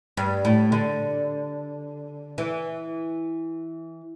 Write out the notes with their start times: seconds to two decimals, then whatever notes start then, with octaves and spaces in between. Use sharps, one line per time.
0.17 G2
0.45 A2
0.72 D3
2.38 E3